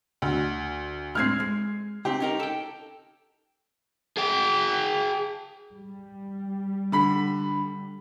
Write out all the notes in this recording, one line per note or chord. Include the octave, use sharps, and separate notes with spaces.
D2
A2 G#3 C4 F6 G#6 C7
G#3
C#2 C4 D#4 G4
C#4 D#4 A#4
A4 G5
G#4 G5
G3
D3 B5 B6